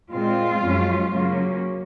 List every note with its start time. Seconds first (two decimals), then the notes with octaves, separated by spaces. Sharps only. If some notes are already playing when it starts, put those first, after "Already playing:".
0.11 A#2 G#3 C4 F4
0.62 F#2 F3 G#3 C#4
1.12 C#3 F#3 A#3 C#4